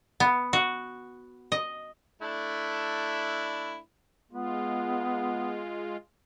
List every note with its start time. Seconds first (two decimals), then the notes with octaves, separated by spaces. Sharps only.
0.20 B3
0.53 F#4
1.52 D#5
2.22 A3 D4 E4
4.32 G#3 B3 F4